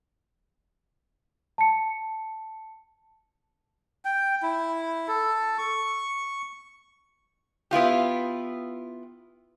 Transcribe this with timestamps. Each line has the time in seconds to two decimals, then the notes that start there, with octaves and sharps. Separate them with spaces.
1.58 A5 C#7
4.05 G5
4.43 E4
5.08 A4
5.58 C#6
7.71 B3 E4 F4 G4